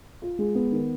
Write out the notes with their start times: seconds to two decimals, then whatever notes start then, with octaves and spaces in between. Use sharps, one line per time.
0.22 F4
0.39 G#3
0.55 B3
0.72 D#3